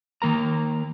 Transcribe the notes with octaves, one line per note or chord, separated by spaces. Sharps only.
D#3 A#3 A#4 A#5